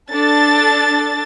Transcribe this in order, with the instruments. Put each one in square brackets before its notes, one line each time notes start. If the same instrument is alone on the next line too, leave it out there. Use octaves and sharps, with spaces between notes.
[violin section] D4 A4 A6